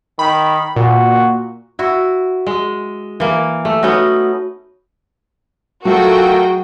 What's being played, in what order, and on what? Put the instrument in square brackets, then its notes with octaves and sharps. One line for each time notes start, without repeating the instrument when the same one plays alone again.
[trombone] D#3 [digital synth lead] B5
[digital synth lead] A#2 [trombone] F#4
[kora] E4 F#4
G#3
E3 A#3
A3
B3 C#4 D#4 F#4
[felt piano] F#3 [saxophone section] A3 F4 [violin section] F#4 G#4 G5 [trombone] A#4